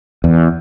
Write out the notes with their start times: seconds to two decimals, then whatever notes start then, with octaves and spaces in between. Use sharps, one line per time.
0.24 E2